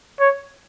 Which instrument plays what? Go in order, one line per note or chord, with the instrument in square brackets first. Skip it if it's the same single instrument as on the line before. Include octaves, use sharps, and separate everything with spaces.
[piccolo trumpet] C#5